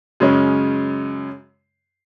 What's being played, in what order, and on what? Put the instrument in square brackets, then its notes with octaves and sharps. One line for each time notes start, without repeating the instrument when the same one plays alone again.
[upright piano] F#2 C#3 G#3 C#4